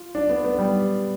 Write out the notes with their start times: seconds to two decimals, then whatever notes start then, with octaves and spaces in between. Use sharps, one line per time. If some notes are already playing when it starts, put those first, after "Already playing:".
Already playing: F4
0.15 D4
0.30 B3
0.44 B3
0.58 G3